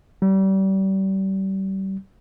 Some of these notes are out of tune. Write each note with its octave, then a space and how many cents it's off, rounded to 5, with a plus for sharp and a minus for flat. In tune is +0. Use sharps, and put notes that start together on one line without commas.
G3 -30